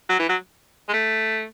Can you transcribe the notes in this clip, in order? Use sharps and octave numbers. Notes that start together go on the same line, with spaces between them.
F#3
E3
F#3
G#3
A3